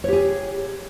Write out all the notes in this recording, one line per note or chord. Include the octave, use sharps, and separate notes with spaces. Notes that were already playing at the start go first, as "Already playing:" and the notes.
G4 G#4 C#5